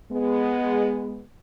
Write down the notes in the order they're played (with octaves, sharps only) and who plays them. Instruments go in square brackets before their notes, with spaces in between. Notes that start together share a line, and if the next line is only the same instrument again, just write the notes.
[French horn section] G#3 B3